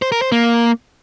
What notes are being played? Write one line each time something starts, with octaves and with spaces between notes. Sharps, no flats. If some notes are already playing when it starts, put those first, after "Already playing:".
C5
A#4
C5
A#3